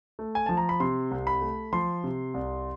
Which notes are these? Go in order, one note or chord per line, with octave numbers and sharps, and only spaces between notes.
A3
G#5
F3 A5
A#5
B5
C3 C6
C2
B5
A3
F3 C6
C3
C2